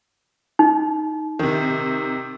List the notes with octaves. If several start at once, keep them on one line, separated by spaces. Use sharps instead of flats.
D#4
C3 D#3